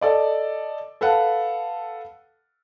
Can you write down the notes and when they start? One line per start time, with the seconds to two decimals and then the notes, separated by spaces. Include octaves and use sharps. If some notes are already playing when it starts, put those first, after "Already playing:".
0.01 A4 D5 D#5
1.01 A4 B4 F5 F#5 A5